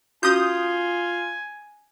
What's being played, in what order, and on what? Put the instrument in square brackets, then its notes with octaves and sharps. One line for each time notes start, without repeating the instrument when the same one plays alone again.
[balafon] C#4 F#4 [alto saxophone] F4 [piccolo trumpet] G#5 [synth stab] D#6 G6